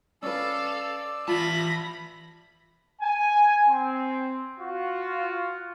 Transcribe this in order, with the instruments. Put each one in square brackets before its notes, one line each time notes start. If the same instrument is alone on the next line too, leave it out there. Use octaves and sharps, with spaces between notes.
[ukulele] C#4 B4 [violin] A4 F5 [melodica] D5 E6
[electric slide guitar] E3 E5 A5 [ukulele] F4 [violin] B5 A#6
[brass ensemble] G#5
C4
F4 F#4